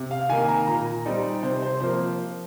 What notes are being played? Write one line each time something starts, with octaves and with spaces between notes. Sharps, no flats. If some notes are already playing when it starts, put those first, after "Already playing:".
Already playing: C3
F5
D#3 A#3 G#5
A#5
A#2 A#5
G3 C4 D#4 D5
C3 C5
C5
F3 A#3 C5